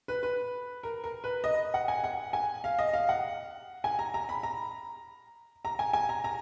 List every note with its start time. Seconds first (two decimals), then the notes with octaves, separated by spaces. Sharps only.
0.08 B4
0.23 B4
0.83 A#4
1.04 A#4
1.24 B4
1.44 D#5
1.74 F#5
1.88 G#5
2.04 F#5
2.33 G#5
2.64 F5
2.79 D#5
2.93 F5
3.09 F#5
3.84 G#5
3.99 A#5
4.14 A#5
4.29 B5
4.43 A#5
5.65 A#5
5.79 G#5
5.93 G#5
6.09 A#5
6.24 A#5